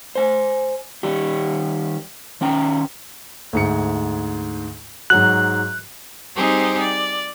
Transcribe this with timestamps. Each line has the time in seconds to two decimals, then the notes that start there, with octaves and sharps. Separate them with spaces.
0.15 C5 G#5
1.03 D#3 G3 G4
2.41 D#3 C#4 G5 A#5
3.53 D2 G#2 C#7
5.10 G#2 F#3 F#4 F#6
6.36 G3 C4 D#4 G4 G#4 C5
6.81 D5